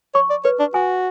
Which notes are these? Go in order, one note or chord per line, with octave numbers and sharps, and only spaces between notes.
C#5 C#6
D5
B4 C#5
D4
F#4 G#5